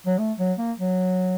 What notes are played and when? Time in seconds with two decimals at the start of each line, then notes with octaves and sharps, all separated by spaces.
0.06 F#3
0.18 A3
0.39 F#3
0.58 A#3
0.78 F#3